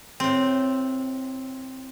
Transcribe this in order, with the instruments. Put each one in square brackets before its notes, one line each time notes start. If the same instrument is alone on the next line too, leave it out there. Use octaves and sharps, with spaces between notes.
[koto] A2 C4